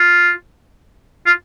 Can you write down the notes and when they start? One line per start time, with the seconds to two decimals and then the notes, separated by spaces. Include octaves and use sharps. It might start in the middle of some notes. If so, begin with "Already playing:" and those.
Already playing: F4
1.26 F4